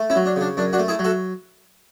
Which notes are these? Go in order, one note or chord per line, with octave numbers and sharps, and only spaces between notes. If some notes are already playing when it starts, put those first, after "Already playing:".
Already playing: A3
C#4 E4
F#3
D4
C#3 D4
F#2 D4
D4 F#4
A3
E4 G#4
F#3
F#4 A4